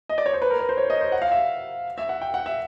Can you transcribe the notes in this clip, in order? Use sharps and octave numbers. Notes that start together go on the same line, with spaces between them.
D#5
D5
C#5
C5
B4
A#4
B4
C5
C#5
D#5
C5
F#5
F5
E5
E5
F#5
G5
F#5
E5